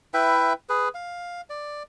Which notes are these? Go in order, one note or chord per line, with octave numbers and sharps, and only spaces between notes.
E4 B4 E5 G5
G#4 B4
F5
D5